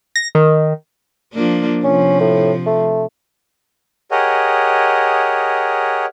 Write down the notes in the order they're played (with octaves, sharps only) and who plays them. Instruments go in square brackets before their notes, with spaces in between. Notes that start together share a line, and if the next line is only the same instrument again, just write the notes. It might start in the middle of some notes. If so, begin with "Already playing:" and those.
[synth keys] A#6
D#3
[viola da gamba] F3 A#3 D4
[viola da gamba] C3 F3 [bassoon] C#4
[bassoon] A2
A3
[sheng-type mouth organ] G4 G#4 A#4 C#5 D#5 F#5